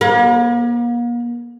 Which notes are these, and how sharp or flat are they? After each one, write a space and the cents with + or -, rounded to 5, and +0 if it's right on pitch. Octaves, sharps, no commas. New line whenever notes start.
A#3 +40